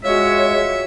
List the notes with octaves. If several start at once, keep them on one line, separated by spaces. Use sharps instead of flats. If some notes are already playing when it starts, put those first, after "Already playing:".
G#3 F4 F#4 C#5 E5